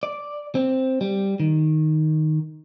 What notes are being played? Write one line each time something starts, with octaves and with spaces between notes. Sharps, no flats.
D5
C4
G3
D#3